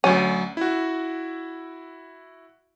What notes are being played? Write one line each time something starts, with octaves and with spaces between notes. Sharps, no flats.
D2 F#3 C#4 D#7
E4 F#4